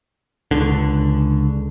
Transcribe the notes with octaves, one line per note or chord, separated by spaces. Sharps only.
C#2 D3